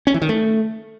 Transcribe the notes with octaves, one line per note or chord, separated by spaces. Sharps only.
C#4
E3
D#3
A3